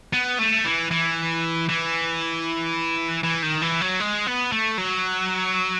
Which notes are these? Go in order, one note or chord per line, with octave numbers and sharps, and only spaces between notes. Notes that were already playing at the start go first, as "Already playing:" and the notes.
B3
A3
E3
E3
E3
E3
D#3
E3
F#3
G#3
B3
A3
F#3